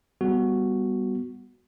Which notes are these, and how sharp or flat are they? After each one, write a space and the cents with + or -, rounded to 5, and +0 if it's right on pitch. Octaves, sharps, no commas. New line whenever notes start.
G3 +0 B3 -5 F#4 +0